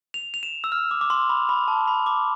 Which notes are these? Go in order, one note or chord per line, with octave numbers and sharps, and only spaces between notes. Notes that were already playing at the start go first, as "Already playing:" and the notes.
F7
F7
E7
E6
F6
D6
D6
C6
B5
B5
A5
B5
D6